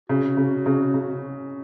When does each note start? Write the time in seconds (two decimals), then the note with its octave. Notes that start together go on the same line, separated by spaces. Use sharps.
0.09 C#3 F#4
0.37 C#3
0.66 C#3
0.94 C#3